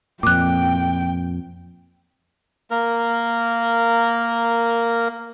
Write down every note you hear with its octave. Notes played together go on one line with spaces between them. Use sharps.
F2 A#2 G5 D6 F#6
A#3 A#4